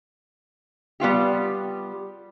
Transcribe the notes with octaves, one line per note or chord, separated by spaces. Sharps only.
G3 B3 F4 G4